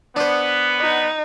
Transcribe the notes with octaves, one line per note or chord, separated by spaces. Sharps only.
B3 D4 C5
D#4